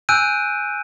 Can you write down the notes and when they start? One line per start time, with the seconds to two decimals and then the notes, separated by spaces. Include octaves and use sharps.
0.09 G#5 E6 F#6 G6 D7 D#7